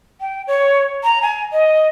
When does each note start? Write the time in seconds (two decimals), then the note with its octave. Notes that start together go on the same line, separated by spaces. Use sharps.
0.21 G5
0.47 C#5
1.03 A#5
1.22 G#5
1.52 D#5